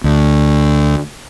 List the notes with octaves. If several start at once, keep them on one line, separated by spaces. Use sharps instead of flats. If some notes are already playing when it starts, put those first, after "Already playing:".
D2